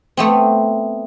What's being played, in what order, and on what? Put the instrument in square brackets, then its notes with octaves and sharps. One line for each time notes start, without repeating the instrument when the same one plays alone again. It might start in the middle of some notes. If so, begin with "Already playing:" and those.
[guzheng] A3 B3 C4